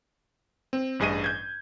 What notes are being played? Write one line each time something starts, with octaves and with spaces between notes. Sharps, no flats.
C4
A1 G2 G#4 D#5 D#7
G6 G#6